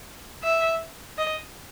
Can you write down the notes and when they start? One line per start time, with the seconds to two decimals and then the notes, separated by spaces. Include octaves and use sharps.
0.44 E5
1.18 D#5